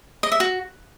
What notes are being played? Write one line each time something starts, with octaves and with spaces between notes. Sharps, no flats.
D#5
E5
F#4